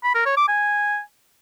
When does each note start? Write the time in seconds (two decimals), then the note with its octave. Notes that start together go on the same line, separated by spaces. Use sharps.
0.04 B5
0.15 A#4
0.26 C#5
0.37 D6
0.48 G#5